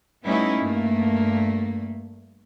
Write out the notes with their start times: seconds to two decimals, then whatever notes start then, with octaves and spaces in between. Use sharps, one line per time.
0.24 G3 A3 B3 C#4 D#4 E4
0.60 G2 A3 A#3